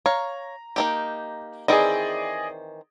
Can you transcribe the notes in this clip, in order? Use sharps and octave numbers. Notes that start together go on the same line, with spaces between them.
C#5 F5 A#5
A#3 D#4 G4
D#3 E3 C4 G#4 D5 D#5